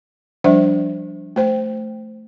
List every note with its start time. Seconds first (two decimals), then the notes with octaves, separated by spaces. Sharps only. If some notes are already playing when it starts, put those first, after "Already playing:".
0.44 F3 G3 D4 C5 D5 E5
1.36 A3 C5 G5